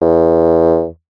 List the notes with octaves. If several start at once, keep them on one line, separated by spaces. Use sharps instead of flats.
E2